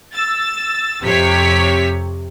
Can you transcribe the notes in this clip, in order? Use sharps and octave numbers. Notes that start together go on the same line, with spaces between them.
E6 A6
F2 C3 C#5 B6